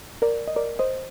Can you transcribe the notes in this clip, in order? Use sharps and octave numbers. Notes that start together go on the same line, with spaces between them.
A#4 D5
D#5
A#4 D5
C5 D#5